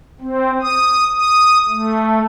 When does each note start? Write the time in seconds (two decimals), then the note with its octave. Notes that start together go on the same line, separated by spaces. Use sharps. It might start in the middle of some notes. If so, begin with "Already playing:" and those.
0.20 C4
0.61 D#6
1.16 D#6
1.69 A3